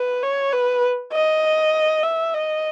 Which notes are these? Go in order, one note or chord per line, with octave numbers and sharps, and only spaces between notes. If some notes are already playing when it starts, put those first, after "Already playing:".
Already playing: B4
C#5
B4
D#5
E5
D#5